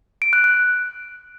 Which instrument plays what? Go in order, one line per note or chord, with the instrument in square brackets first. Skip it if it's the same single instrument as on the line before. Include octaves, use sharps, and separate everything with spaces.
[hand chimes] D7
F#6
F#6